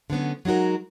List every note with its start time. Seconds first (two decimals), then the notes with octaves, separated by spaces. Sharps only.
0.10 D3 F#3 B3 C#4
0.45 F#3 G#3 D#4 F#4 A#4